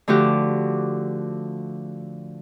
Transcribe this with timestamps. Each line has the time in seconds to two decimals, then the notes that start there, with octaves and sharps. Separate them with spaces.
0.08 D3 F3 A3 F#4 G4